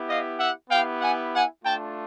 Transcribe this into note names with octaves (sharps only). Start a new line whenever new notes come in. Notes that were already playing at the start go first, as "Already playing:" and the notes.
Already playing: B3 E4 G4
D#5 F5
E5 F#5
B3 E4 G4 F5 G5
F#5 G#5
F#5 G#5
A3 D4 F4 G5 A5